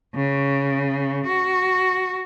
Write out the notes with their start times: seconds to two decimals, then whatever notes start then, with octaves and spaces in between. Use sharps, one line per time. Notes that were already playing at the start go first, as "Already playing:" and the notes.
0.15 C#3
1.26 F#4